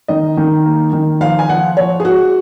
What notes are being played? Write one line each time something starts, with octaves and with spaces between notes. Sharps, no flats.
D#3 D#5
D#3
A#3
D#3
F3 F5
G#5
F3 F#5
F3 C#5
G#4
G#3 F#4